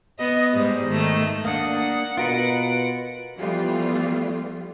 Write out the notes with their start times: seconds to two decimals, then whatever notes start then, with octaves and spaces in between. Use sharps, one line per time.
0.19 B3 D#5
0.54 G#2 G3 G#3
0.86 D#3 A3
1.45 A#3 D4 F#5 D#6
2.17 B2 F4 A#4 B4 D7
3.36 E3 F3 G3 A3 B3 F4